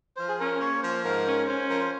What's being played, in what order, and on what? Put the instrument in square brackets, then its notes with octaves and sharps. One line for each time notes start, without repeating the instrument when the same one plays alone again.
[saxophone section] F3 [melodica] C5
[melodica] G#4
[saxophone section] C#4 [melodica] A#4
[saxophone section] A#3 [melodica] C#5
[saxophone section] F3 [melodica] C5
[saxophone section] G#2 [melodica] A#4
[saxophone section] C#4
[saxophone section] C#4 [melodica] C5
[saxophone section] F3 [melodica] A#4
[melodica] C5